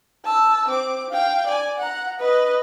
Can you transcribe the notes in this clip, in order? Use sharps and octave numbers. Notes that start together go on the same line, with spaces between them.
A5 E6
C4 D6
F5 G5
D5 G#5
F#5 A#5
B4 D#5